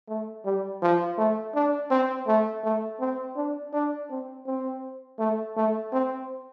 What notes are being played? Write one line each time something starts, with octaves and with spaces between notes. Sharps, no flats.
A3
G3
F3
A3
D4
C4
A3
A3
C4
D4
D4
C4
C4
A3
A3
C4